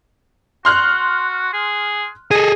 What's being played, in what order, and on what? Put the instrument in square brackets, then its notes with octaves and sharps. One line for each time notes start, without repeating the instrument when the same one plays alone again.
[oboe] F#4 [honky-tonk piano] C6 F6 F#6
[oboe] G#4
[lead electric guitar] G#4 A4 [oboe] D#5